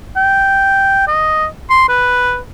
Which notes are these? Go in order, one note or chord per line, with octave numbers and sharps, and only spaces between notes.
G5
D#5
C6
B4